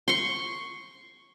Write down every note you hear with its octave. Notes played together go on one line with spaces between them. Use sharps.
C6 C#6